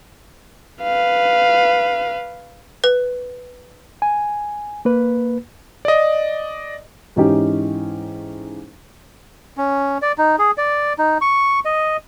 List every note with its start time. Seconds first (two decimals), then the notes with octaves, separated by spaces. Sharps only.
0.82 B4 F5
2.84 B4
4.02 G#5
4.85 A#3 B4
5.85 D5 D#5
7.16 G#2 E3 C#4 D#4 G4
9.57 C#4
10.02 D5
10.18 D#4
10.38 G#4
10.58 D5
10.99 D#4
11.21 C#6
11.65 D#5